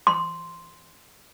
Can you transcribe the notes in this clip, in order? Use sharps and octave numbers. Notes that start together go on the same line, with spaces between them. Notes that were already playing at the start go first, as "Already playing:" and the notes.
C6